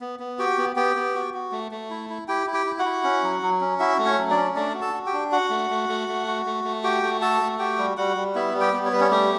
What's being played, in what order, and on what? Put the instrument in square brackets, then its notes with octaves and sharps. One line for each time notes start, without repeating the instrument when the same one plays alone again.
[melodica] B3
B3
F#4 G4 G5
B3
B3 G4 G5
B3
F#4
F#4
A3
A3
E4
E4
E4 G4 G5
E4
G4 G5
E4
F#4 F#5
E4
C#4
F#3
F#3
C#4
E4 F#4 E5
A3
C#4 C#5
F#3
D4 D5
C#4
A3 D4 D5
F#4
A4 A5
F#4
G4 G5
D4
F#4 F#5
A3
A3
A3
A3
F#4
A3
A3
F#4 G4 G5
A3
F#4 A4 A5
A3
F#4 G4 G5
G3
G3 F#4 F#5
G3
B3 E4 E5
G3
G4 G5
B3
C#5
G3 B4
C#4 C#5
A3 G4